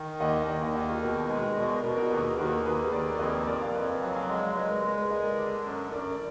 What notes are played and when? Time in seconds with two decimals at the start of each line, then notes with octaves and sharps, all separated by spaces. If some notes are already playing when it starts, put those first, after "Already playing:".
Already playing: D#3
0.20 D#2 D#5 F#5
0.48 D#2 A#4 D5
0.61 F5 G#5
0.74 D#3 D#5 F#5
0.88 F4 G#4
1.02 B2 F#4 A#4
1.29 G#3 G#4 B4
1.56 B2 A#4 D5
1.70 B4 D#5
1.83 B2 A#4 D5
1.97 F#4 A#4
2.10 D#2 G#4 B4
2.38 D#2 F#4 A#4
2.65 D#2 G#4 B4
2.92 D#2 A#4 D5
3.15 D5
3.19 F2 B4 D#5
3.47 F2 A#4 D5
3.60 D5 F5
3.74 F2 B4 D#5
4.01 F#3 F5 G#5
4.15 F5 G#5
4.28 G#3 D#5 F#5
4.42 D5 F5
4.55 G#3 B4 D#5
4.69 A#4 D5
4.83 G#3 G#4 B4
4.97 A#4 D5
5.10 G#3 B4 D#5
5.23 A#4 D5
5.37 D3
5.65 F#2
5.92 F#2 A#4 D5
6.10 D5